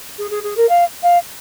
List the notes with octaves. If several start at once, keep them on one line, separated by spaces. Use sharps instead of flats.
G#4
G#4
G#4
A#4
F5
F5